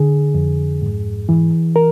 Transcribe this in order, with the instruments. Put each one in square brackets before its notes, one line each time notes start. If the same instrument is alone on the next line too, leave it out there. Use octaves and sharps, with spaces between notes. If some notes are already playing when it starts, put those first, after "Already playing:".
Already playing: [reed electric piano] D3 G#4
F2
G#2
E3
A#4